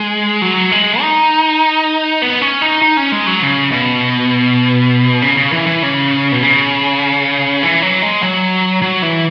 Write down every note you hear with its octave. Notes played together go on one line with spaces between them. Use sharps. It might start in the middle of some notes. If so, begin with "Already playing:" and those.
Already playing: G#3
F#3
G#3
D#4
B3
C#4
D#4
D#4
C#4
G#3
F#3
C#3
B2
C#3
C#3
E3
E3
C#3
B2
C#3
E3
F#3
G#3
F#3
F#3
E3